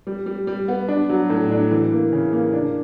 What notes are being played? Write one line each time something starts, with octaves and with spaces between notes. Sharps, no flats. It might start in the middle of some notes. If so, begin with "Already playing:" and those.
G3
G3
G3
B3
D4
F#3
A2
D4
E3
A#3
C#3
A#3
D4